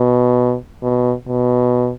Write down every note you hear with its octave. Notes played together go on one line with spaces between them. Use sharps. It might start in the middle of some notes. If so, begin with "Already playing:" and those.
Already playing: B2
B2
B2